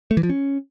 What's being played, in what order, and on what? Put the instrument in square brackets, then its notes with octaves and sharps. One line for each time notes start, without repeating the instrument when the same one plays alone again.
[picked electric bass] A3
E3
F3
C#4